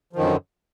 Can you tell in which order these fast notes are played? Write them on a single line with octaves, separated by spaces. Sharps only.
F3 D#3 F#2 D3